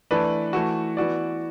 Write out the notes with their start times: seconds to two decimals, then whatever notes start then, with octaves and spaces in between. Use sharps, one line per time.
0.11 E3 A3 D4 B4 D5
0.53 E3 A3 F#4
0.97 E3 B3 F#4 D5